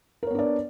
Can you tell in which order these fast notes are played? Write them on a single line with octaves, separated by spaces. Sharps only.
A#4 C#5 B3 D4 D5